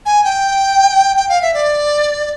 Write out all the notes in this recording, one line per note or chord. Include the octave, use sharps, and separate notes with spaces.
G#5
G5
G5
F5
E5
D5